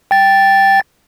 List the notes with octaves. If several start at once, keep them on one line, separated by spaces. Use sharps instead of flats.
G5 A6